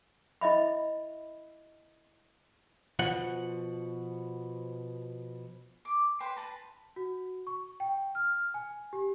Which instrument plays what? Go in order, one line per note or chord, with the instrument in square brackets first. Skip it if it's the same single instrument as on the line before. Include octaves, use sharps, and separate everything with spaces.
[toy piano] E4 D#5 E5 B5
[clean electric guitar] B2 F3 F#5
[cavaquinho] D6
B4 C5 G5 B5
B4 A5 A#5
[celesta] F#4
C#6
G5
F6
G#5
G4